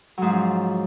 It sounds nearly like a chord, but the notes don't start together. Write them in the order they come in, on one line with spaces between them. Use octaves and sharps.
F#3 G#2 F3 C#4